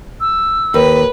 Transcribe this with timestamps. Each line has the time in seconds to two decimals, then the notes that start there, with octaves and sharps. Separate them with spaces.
0.20 E6
0.74 D#2 B4